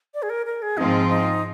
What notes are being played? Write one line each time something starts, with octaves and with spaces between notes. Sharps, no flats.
D5
G#4
A#4
A#4
G#4
G#2 F3 C4 D#4 F4
D#4